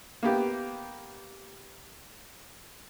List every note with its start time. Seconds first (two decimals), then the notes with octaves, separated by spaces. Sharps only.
0.23 A#3 B3 G4